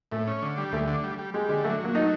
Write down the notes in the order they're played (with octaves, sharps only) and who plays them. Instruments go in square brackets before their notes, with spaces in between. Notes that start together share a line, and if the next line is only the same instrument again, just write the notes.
[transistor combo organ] A2 [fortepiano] A3
[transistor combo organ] C#4
D3
G3
[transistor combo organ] D2 [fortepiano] A3
[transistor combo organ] D3
G3
G3
[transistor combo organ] G3 [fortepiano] G#3
[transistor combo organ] D3 [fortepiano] G#3
[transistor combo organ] F#3 [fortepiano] A3
[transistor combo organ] F#3
[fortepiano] A#3
[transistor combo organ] A3 [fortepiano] D#4